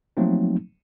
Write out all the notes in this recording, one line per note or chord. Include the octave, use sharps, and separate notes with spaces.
F3 F#3 A3 A#3 C4 D#4